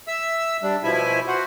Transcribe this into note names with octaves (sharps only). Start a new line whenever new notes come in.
E5 E6
G3 D4
B2 F3 E4 E5 G#5
F#4 C5 F#5